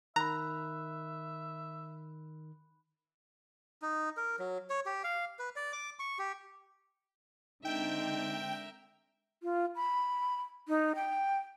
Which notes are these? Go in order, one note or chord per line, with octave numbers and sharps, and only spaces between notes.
D#3 E5 A#5 B5 F#6
D#4
A#4
F#3
C#5
G4
F5
B4
D5
D6
C#6
G4
D3 G#3 C4 D#4 A#4 E5 G5
F4
B5
D#4
G5